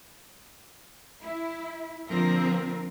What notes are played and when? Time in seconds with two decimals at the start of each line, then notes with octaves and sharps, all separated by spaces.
1.22 E4
2.08 D3 F3 A#3 C4 F4 A#4